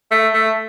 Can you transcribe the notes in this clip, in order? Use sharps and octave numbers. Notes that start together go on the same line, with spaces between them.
A3
A3